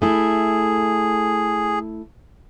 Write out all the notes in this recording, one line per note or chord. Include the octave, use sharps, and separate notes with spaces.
A3 E4 G#4